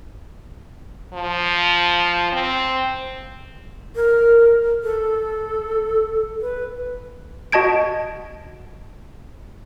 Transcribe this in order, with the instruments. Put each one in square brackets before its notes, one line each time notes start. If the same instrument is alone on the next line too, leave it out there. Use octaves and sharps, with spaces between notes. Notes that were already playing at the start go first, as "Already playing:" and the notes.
[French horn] F3
C4
[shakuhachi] A#4
A4
B4
[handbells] F#4 D#5 A5 G#6 D7